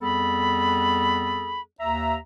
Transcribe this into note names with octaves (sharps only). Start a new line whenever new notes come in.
F2 G3 B3 G#4 A4 B5
D#2 E5 A#5